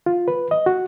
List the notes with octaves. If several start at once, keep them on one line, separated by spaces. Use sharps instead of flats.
F4
B4
D#5
F#4